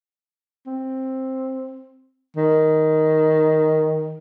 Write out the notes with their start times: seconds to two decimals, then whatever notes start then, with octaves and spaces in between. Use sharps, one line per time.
0.66 C4
2.37 D#3